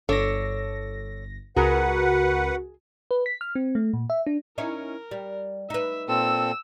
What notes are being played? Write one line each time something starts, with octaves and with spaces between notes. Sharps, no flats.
G1 D4 A4 C#5 A#6
C#2 F#4 G#4 A#4 B4 F#5
B4
B6
F6
C4
A3
A#2
E5
D4
C#4 D#4 E4 A#4
G3
D#4 B4 E5
A#2 C4 A4 E6